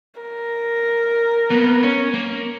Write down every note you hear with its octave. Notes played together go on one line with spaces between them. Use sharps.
A#4
A#3 B3
C#4
A#3